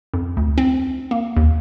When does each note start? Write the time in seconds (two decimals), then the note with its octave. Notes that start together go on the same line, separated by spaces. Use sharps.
0.14 F2
0.37 D2
0.58 C4
1.11 A#3
1.36 D#2